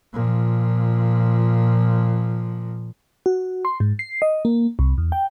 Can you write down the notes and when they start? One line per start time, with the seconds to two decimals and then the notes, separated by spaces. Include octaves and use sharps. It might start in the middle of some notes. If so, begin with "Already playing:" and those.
0.14 A#2 F3
3.26 F#4
3.65 C6
3.80 G#2
3.99 C7
4.22 D#5
4.45 A#3
4.79 C2
4.98 E2
5.12 G5